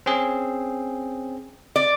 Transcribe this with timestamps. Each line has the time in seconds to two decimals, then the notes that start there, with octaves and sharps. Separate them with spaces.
0.06 C4 C#4 G#4
1.76 D5